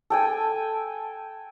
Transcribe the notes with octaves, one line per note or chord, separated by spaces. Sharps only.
A4 G5 G#5